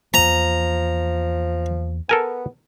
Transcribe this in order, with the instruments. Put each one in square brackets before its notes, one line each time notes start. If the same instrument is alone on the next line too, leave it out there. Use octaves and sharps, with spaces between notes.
[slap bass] E2 A#3 [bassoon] F3 [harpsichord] A#5
[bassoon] B3 [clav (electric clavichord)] A4 A#4 G#5